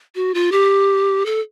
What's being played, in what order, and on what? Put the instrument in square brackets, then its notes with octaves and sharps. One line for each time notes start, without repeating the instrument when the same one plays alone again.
[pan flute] F#4
F4
G4
A4